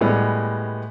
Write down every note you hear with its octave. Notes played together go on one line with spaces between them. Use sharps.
A2 G3 G#3 B3